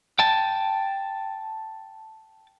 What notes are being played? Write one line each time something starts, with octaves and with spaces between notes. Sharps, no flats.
G5 A5